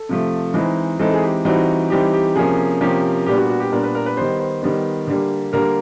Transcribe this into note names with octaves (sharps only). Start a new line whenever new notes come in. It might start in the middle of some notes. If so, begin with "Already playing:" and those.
Already playing: A4
C3 F3 A3
E3 G#3 C4 D#4
E3 G#3 C4 D#4 A4
G#4
G4
E3 G3 C4 D#4 F#4
E3 G3 C4 D#4 G4
G4
C3 F3 A#3 C#4 G#4
C3 F3 A#3 C#4 G4
A#2 G3 B3 D4 G4
F#4
F#4
G4
A#2 G3 B3 D4 A#4
B4
A#4
B4
D#3 G3 B3 C5
C5
D#3 G3 B3
D3 G3 A#3
D3 G3 A#3 A#4